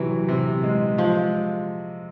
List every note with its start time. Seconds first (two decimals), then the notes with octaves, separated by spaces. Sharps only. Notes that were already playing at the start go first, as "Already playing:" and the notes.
Already playing: C3 E3 F#3
0.29 C3
0.63 G#3
0.98 F3 G#3